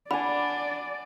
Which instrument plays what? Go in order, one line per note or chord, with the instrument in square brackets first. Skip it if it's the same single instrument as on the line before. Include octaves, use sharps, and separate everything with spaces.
[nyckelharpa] D4 [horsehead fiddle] D5 [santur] F#5 G#5 [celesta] B5